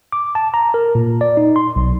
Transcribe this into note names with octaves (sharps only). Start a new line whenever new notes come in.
D6
A5
A#5
A#4
A#2
D5
D#4
C6
B1